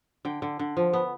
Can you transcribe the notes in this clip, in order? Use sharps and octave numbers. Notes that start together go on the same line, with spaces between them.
D3 G5
D3
D3
F3
B3